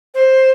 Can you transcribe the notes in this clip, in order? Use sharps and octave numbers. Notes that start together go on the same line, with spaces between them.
C5